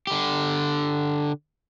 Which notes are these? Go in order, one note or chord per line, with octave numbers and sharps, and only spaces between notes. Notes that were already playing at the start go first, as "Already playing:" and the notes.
D3 G4